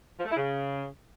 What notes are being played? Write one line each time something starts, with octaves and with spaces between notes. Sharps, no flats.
F3
A3
E4
C#3